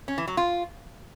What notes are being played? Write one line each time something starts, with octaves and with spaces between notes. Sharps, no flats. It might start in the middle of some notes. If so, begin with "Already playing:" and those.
C#4
E3
F#3
F4